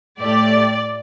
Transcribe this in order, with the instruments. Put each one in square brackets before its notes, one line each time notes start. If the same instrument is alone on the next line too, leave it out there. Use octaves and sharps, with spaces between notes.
[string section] A2 A3 G4 [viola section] D5